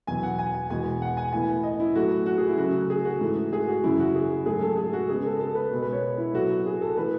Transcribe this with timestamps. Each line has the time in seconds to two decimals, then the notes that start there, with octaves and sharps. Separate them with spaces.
0.07 E2 B2 F#3 B3 G#5
0.23 F#5
0.39 G#5
0.55 G#5
0.70 E2 B2 G#3 B3 G#5
1.02 F#5
1.17 G#5
1.33 A2 E3 B3 G#5
1.63 D#5
1.80 E4
1.96 A2 F#3 A3 F#4
2.26 F#4
2.38 G#4
2.47 E4
2.58 C#3 F#3 A3 F#4
2.90 G#4
3.05 F#4
3.20 G#2 E3 A3
3.53 G#4
3.68 F#4
3.84 F#2 C#3 E3 E4
4.00 F#4
4.15 G#4
4.46 G#2 F#3 A3 G#4
4.61 A4
4.77 G#4
4.93 F#4
5.09 C#3 G#3 B3 G#4
5.25 A4
5.40 A4
5.55 B4
5.71 B2 G#3 B3
5.82 B4
5.93 C#5
6.02 B4
6.18 E4
6.33 A2 F#3 A3 F#4
6.66 G#4
6.81 A4
6.97 E3 A3 B4